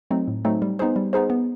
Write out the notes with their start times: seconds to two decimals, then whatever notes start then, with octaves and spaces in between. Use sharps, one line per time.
0.11 F#3 A3 C4 D#4
0.28 A2
0.45 F#3 A3 C4 D#4
0.62 G3
0.79 B3 D#4 G#4 C5
0.96 G3
1.13 B3 D#4 G#4 C5
1.30 B3